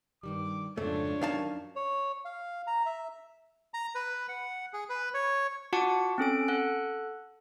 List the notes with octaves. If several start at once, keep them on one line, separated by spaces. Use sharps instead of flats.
G2 D#3 G3 D6
F2 G#2 C#3 A3 D4 F4 C#5
F#2 D#3 C#4 F5 A5
C#5
F5
A#5
E5
A#5
B4
F#5
G#4
B4
C#5
F4 F#4 F#5 A5 D6 C#7
C4 C#4 A4 D7
A4 F#5 F#6